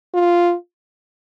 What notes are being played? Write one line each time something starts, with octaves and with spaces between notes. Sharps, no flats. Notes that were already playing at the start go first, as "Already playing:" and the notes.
F4